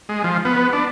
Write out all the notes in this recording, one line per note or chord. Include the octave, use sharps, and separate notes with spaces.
G#3
F3
B3
D4